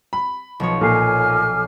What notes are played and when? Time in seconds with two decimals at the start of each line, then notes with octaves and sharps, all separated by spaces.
0.13 B5
0.60 B1 F3 C#5
0.81 A#2 A4 G#5 D6 F6 C7